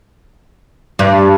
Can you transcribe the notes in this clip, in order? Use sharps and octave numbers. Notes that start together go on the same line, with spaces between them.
G2